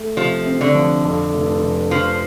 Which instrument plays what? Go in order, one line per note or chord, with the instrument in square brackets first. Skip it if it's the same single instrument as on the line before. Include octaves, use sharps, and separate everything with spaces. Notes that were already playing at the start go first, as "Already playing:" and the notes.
Already playing: [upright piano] A3
[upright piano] C3 [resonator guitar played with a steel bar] F3
[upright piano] C4
[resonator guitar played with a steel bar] D3
[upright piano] F3
F2
F1
F1
[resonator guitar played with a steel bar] F3 [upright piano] D4